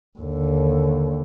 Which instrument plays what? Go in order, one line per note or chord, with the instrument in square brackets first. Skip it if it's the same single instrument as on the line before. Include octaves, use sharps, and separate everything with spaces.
[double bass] D#2 D3